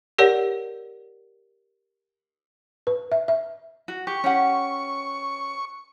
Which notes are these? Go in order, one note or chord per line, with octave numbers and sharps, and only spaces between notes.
G4 A#4 C#5 D5 F#5
B4
E5
E5
F#4
G4 C#6
C#4 G4 F#5